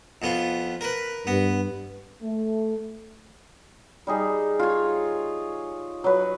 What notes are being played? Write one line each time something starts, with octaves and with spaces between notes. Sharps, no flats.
F2 B3 F4
A#4 B4
G2 B3
A3
G3 D#4 G#4
F4 C#5
F#3 B4